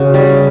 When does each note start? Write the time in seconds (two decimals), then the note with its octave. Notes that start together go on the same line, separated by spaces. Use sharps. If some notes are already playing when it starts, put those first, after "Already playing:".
Already playing: C#3 F#4
0.14 G3